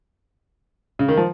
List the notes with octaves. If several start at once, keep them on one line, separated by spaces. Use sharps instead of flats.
C#3
D#3
F3